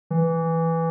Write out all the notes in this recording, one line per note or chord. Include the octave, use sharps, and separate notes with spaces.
E3